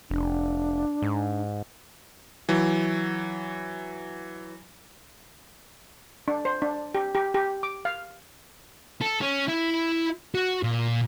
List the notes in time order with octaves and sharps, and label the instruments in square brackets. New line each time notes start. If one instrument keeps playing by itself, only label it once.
[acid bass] F1 [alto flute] D4
[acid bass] G#2
[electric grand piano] E3 F#3
[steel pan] D4
C5
D4
G4
G4
G4
D6
F5
[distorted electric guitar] A4
C#4
E4 E5
F#4
A#2